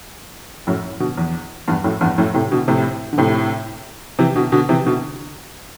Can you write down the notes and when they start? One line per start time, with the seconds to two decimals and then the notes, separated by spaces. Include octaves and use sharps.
0.67 F#2 A2
1.00 B2 D3
1.17 E2
1.68 E2 G2
1.84 F#2 A2
2.01 E2 G2
2.18 F#2 A2
2.34 A2 C3
2.51 B2 D3
2.68 A2 C3
3.13 D3
3.18 A2 C3
4.19 C3 E3
4.36 B2 D3
4.52 B2 D3
4.69 C3 E3
4.86 B2 D3